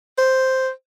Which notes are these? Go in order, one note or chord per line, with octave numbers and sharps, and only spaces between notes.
C5